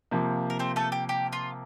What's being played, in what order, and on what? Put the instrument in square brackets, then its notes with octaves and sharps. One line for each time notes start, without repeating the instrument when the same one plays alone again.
[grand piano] C3 F3 A#3
[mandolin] A#4
C4 C5
A3 A4
G4
G4
F4